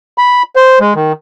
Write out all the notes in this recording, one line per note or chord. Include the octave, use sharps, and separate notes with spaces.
B5
C5
G#3
D#3